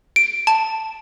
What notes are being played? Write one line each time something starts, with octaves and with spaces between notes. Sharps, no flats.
D7
A5